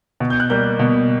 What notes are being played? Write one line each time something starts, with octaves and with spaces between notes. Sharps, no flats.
B2
G6
F#6
G3 A#3 G6
B2